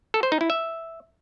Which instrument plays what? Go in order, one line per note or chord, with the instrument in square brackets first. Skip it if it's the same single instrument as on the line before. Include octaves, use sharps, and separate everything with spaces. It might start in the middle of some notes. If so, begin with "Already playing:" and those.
[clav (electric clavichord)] A4
C5
D#4
E4
E5